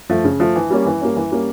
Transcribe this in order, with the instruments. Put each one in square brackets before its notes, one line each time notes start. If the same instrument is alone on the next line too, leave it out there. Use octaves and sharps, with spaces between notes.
[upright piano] F3 A3
C#3
F3 A3
E3
G3 A#3 C#4
E3
G3 A#3 C#4
E3
G3 A#3 C#4